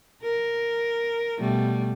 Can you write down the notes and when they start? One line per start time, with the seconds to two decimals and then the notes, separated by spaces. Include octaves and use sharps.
0.23 A#4
1.39 B2 G3 A3